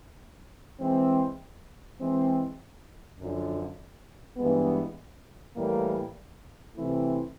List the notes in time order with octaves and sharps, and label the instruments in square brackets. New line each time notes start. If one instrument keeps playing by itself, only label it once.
[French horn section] E3 G#3 C4
E3 G#3 C4
F#2 D3 F3
G2 E3 G#3 B3
A2 E3 G3 A#3
C3 E3 A3 C4 E4